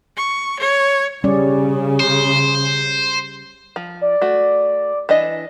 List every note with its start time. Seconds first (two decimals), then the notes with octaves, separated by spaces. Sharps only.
0.16 C#6
0.60 C#5
1.24 C#3 G3 C#4 D5
2.00 C5
3.76 F3
4.01 D5
4.22 A3 F#4
5.09 E3 D4 D#5